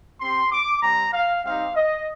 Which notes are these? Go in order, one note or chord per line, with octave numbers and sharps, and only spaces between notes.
C4 G4 C6
D6
G3 C4 G4 A#5
F5
G3 C4 D#4 G4 F5
D#5